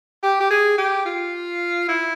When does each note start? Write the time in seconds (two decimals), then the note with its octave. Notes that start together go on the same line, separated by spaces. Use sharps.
0.23 G4
0.40 G4
0.51 G#4
0.78 G4
1.05 F4
1.89 E4